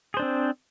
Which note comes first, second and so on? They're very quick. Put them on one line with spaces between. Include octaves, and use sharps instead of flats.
G#4 C5 D4 C4